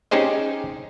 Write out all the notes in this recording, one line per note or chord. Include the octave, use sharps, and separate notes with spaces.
C#4 D#4 G4 G#4 C5 D#5